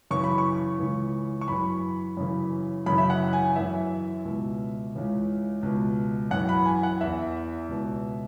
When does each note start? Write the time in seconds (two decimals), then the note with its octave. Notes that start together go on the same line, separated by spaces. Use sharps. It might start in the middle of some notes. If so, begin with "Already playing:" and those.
0.11 F#2 C#3 E3 C#6
0.24 B5
0.38 C#6
0.79 C#2 C#3 E3
1.41 C#6
1.48 F#2 E3 B5
2.17 F#2 C#3 E3
2.86 F#2 C#3 E3 B5
2.98 E5
3.10 F#5
3.33 G#5
3.56 F#2 E3 E5
4.25 C#2 B2
4.94 C#2 C#3 E3
5.63 C#2 B2
6.31 F#2 E3 F#5
6.49 B5
6.66 G#5
6.83 F#5
7.00 E2 E3 E5
7.69 C#2 B2